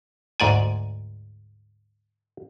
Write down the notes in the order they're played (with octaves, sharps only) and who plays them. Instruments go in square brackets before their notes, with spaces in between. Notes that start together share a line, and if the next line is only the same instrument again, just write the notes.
[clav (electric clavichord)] D2 G#2 D5 G#5